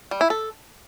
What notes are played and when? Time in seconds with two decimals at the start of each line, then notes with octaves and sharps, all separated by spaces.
0.11 G3
0.21 E4
0.30 A4